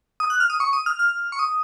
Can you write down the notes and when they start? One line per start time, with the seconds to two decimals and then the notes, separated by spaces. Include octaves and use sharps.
0.20 D#6
0.30 F#6
0.40 F6
0.50 D#6
0.60 C#6
0.73 D#6
0.86 F6
0.99 F6
1.32 C#6
1.39 D#6